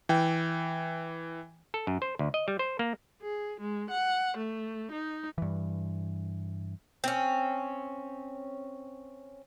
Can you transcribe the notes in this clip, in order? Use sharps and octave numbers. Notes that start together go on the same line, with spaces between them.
E3 G5
A4
F#2
C5
D2
D#5
G3
C5
A#3
G#4
G#3
F#5
A3
D#4
G2 E3
C4 C#4